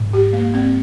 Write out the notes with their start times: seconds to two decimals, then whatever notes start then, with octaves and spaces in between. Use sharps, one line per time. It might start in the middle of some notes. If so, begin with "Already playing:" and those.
Already playing: G#2
0.13 G4
0.33 A#3
0.54 C4